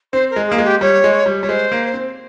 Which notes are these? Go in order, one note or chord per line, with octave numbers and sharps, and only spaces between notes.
C4 C5
A#4
G#3
A#3 G#4
G#3
G4
G3 C#5
G#3
G3
G3 C#5
G#3 C5
A#3
C4